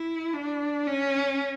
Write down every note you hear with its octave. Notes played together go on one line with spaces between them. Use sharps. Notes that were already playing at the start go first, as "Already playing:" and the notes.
Already playing: E4
D4
C#4